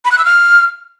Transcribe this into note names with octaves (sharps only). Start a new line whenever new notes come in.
B5
F#6
E6
F6